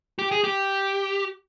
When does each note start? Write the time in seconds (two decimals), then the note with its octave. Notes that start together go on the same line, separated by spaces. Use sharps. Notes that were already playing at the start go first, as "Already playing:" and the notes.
0.19 G4
0.31 G#4
0.44 G4